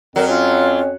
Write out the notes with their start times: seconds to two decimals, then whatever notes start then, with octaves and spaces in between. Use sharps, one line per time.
0.16 F2 F#3 A#4
0.29 C#4 F4